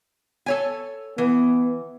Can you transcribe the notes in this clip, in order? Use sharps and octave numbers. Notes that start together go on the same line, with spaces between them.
A4 C#5 G#5
E3 B3